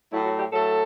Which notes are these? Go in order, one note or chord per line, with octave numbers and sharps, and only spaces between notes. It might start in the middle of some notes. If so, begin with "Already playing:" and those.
A2 F#3 A3 E4
F#4
G4
A2 F#3 A3 A4